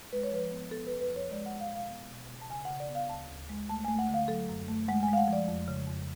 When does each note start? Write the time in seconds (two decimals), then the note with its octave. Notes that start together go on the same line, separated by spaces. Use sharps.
0.13 G#3 B4
0.23 C#5
0.32 F3 B4
0.52 B3
0.71 B3 A4
0.87 B4
0.91 F2
1.01 B4
1.11 F3
1.16 C#5
1.31 G#3 D5
1.46 F#5
1.50 G#3
1.60 F5
1.70 B2 F5
1.90 B3
2.11 B2
2.30 B2
2.41 A5
2.50 C#3 G#5
2.65 F#5
2.70 C#3
2.80 D5
2.90 B3
2.95 F5
3.09 D2 A5
3.30 D2
3.49 G#3
3.69 A3 A5
3.85 G#5
3.88 A3
3.99 F#5
4.09 D3
4.14 F5
4.28 F#3 A4
4.49 F#2
4.68 A3
4.88 G#3 F#5
5.03 G#5
5.09 G#3 F5
5.17 F#5
5.28 F3 D5
5.48 F2
5.68 C#3
5.87 F2